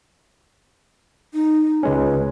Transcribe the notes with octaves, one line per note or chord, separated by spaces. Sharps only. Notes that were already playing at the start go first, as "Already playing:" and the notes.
D#4
C#2 G#3 C#4 B4